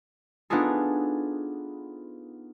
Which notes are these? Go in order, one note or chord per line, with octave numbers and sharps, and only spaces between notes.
B3 D4 D#4 F4 G#4 A4